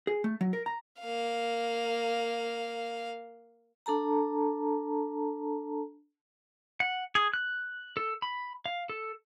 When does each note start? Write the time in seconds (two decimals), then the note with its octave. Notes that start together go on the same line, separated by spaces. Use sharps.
0.07 G#4
0.24 A3
0.41 F#3
0.53 A#4
0.66 A#5
1.01 A#3 F5
3.86 D4 A4 A5 A#5
6.80 F#5
7.15 G#4
7.34 F#6
7.97 A4
8.22 B5
8.66 F5
8.89 A4